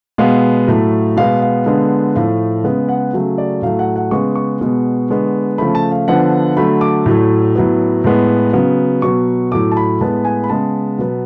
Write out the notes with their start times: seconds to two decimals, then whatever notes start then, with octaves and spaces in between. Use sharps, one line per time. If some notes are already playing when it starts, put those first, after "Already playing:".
0.18 B2 G#3 B3 F5
0.67 A2 F#3 A3
1.17 B2 G#3 B3 F5
1.42 F5
1.66 D3 G#3 B3
2.15 A2 F3 A3 F5
2.64 C#3 G#3 B3
2.89 F#5
3.13 C#3 F#3 A3
3.38 D5
3.62 A2 F#3 A3 F5
3.79 F#5
3.96 F#5
4.11 C#3 G#3 B3 C#6
4.36 C#6
4.61 B2 G#3 B3
5.10 D3 G#3 B3
5.58 C#3 F3 A3 B5
5.75 A5
5.92 F5
6.08 D3 F3 B3 F#5
6.56 D3 F#3 A3 B5
6.81 D6
7.06 A2 F#3 A3
7.56 A2 F#3 B3
8.04 A2 G#3 B3
8.53 C#3 F#3 B3
9.02 B2 F#3 B3 C#6
9.52 A2 F#3 A3 D6
9.72 A5
9.77 B5
10.01 A2 G#3 B3 A5
10.25 G#5
10.44 B5
10.50 C#3 G#3 B3 A5
10.98 B2 F#3 B3